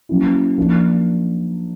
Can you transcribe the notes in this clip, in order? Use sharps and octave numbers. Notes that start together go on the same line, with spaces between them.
F#3 A#3 C#4 E4
F3 A#3 D4